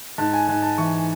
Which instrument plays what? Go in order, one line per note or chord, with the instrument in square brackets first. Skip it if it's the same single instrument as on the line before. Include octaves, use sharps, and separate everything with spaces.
[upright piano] G#2 [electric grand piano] A5
[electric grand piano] G#5
[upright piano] G#2 [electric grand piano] G#5
[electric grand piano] A5
[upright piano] E3 [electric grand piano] C#6